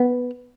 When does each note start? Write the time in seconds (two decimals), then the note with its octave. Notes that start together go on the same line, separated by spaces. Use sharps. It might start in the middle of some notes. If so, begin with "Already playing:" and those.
Already playing: B3